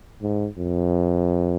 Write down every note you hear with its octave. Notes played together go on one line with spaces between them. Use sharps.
G#2
F2